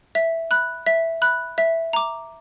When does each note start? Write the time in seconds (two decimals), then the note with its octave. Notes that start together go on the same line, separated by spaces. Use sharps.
0.15 E5
0.51 B5 F#6
0.86 E5
1.22 B5 F#6
1.58 E5
1.93 A#5 D6